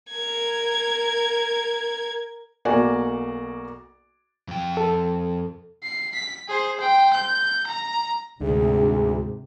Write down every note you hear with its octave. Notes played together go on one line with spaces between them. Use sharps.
A#4 G#6
B1 A#3 F#4 D5 G#5
F2 G5
A4
C7
B6
G#4 C5
C5 G5
G6
A#5
D2 G#2 C3 G#4